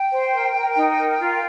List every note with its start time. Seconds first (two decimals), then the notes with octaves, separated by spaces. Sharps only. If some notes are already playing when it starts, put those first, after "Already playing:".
Already playing: G5
0.13 C5
0.33 A#4
0.55 A#4
0.76 D#4
0.98 A#4
1.20 F4